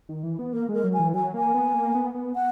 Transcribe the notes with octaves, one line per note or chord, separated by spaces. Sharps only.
D#3
E3
B3
A#3 A#4
G#3 A#4
F#3
G#5
E3
F#3 G#5
A#3 G#5
B3
A#3
B3
B3
F#5